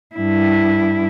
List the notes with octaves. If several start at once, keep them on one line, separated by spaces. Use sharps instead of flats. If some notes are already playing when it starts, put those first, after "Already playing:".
G2 E4